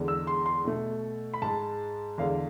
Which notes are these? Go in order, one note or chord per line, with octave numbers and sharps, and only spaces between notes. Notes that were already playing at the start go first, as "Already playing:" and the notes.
Already playing: E2 D3 G#3
E6
C6
C6
B2 A3
B5
G#2 G#3 A5
E2 D3 G#3 F5